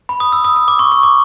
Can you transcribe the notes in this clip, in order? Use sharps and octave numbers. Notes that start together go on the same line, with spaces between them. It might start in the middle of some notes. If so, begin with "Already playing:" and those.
B5
D#6
E6
D#6
D#6
D6
C#6
C#6
D6